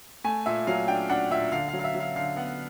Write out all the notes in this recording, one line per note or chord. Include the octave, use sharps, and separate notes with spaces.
A3 G#5
A#2 E5
F#3 F5
D4 G5
D4 F#5
A#2 E5
D3 F5
F5
F#3
F5
E5
F#3
F5
D3 F5
B3 F#5